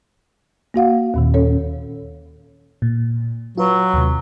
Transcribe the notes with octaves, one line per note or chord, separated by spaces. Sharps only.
A#3 F#4 F5 F#5
D#2 A#2 D#3
C#4 A4 C#5
A#2
F#3 F4 B4
D#2 C3